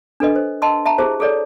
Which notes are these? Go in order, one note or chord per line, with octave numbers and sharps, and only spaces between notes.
D4 A4 B4 D#5
C5
D#5 A5 C6 E6
E5 A5 A#5
E4 G4 G#4 C5
G#4 A4 C#5 D5